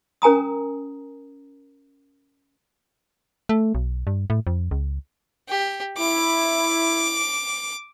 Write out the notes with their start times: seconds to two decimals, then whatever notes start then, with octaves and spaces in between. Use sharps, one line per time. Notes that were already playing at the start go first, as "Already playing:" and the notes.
0.22 C#4 A#4 G#5 A#5 D#6
3.49 A3
3.75 B1
4.07 G2
4.30 A2
4.47 F2
4.71 C#2
5.49 G4
5.98 E4 D6